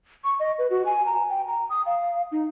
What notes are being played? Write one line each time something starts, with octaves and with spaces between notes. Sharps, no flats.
C#6
D#5
B4
F#4
G#5
A#5
G5
A#5
D#6
F5
D#4